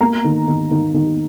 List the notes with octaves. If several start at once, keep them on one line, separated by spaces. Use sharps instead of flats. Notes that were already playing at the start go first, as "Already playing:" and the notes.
A#3 A#5
D#3
D#3
D#3
D#3